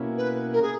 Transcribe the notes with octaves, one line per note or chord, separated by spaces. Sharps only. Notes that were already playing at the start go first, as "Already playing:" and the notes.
Already playing: B2 A#3 C#4 E4
B4
A#4
G#4